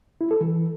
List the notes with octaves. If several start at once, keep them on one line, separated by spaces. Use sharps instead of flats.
E4
A4
E3